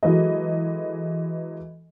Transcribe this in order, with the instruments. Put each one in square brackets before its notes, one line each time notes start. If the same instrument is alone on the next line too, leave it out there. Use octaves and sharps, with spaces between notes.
[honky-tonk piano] E3 F#3 G#3 A4 B4 D#5